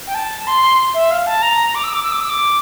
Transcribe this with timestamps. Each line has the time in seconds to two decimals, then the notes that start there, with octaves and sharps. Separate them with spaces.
0.07 G5
0.14 A5
0.47 C6
0.94 E5
1.11 F5
1.27 A5
1.42 A#5
1.75 D6
1.84 E6
1.93 D6
2.03 E6
2.12 D6
2.21 E6
2.29 D6